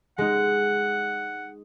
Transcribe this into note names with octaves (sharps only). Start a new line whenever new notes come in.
G#3 D#4 F#5